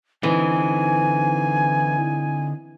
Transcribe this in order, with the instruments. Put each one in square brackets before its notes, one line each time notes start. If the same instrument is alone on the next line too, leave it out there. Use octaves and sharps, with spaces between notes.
[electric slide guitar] D3 C4 D#4 [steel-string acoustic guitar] E3 [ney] G#5